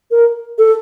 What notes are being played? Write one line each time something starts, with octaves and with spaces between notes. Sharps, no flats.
A#4
A4